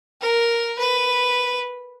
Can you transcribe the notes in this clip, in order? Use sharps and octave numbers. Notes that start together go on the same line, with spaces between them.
A#4
B4